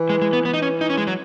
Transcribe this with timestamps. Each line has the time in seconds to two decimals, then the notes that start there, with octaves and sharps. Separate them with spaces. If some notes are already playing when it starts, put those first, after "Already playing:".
Already playing: E3
0.10 G#3
0.22 G#3
0.33 B3
0.45 E3 B3
0.54 D#4
0.62 C#4
0.81 D#4
0.90 C#4
0.97 G#3
1.07 F#3